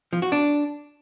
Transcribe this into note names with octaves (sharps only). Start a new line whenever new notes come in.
F3
F#4
D4